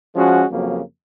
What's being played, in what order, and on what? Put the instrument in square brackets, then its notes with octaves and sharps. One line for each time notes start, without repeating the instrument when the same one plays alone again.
[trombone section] F3 G#3 C#4 F#4
F2 C#3 F#3 A#3